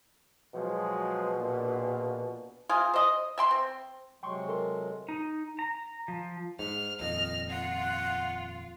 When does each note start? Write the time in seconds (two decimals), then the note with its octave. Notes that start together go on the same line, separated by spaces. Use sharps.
0.54 B2 F3 F#3 G#3
1.36 A#1 A#2
2.69 C3 F4 G#4
2.94 C5 D#5
3.38 E5 G5 C6
3.51 C4
4.23 C3 F#3 G#3 G5 C6 C#6
4.48 A4 A#4 C6
5.09 D#4
5.59 A#5
6.08 F3
6.59 G#2 F6
7.00 D#1 F2 D#5 F6
7.50 F4 F#5